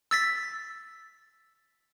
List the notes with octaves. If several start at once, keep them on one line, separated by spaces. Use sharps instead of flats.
E6 A6 B6